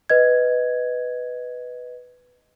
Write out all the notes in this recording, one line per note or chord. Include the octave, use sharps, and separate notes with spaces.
B4 D#5 G#6